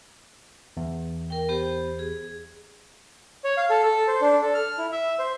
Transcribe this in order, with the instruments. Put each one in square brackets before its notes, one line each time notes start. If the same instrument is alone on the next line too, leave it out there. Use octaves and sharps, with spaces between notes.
[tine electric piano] E2
[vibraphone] A#4 G5
B3 G4 C5
G#4
[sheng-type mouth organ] C#5
F5
A4
A4
C5
D4
A4
F6
E4
E5
C5